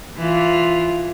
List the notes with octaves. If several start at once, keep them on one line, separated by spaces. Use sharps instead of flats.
E3 F4